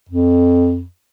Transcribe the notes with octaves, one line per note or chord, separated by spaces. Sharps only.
F2